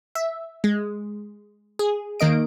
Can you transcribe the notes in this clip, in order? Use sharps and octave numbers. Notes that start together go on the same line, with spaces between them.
E5
G#3
G#4
D#3 A#3 D#5 D7